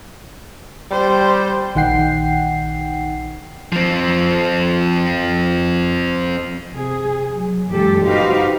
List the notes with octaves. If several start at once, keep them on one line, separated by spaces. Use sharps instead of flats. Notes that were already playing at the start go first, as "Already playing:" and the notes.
G3 C5
A#1 D#3 D#4 F#5 G5 C7
F3 C4
C3 G#4
F#3
F#2 A#2 E3 G#3 G4 A4
D#4 F#4 G4 B4 C5 F5